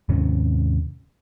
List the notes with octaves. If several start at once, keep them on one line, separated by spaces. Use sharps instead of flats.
D#2 G#2 C3 C#4